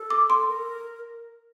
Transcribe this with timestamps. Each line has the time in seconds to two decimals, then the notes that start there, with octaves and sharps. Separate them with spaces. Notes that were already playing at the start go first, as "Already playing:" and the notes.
Already playing: A4
0.10 D6
0.30 C6
0.49 A#4